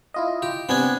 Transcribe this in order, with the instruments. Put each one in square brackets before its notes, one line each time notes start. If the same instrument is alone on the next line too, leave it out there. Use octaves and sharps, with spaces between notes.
[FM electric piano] E4 F4 D#5
[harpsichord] G4
[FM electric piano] C3 G#5 G#6 [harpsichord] B3 C4 D4